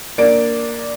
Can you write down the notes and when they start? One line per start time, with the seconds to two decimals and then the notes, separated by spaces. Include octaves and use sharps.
0.18 A#3 D4 D5 D7